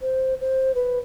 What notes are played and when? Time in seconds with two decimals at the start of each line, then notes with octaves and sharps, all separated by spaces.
0.01 C5
0.41 C5
0.75 B4